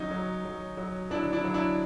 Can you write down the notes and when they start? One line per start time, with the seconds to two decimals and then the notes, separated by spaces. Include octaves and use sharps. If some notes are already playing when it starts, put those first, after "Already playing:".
Already playing: F#3 C#4 D#4
0.11 F#3
0.45 F#3
0.77 F#3
1.10 F#3 D4 E4
1.33 D4 E4
1.44 F#3
1.54 D4 E4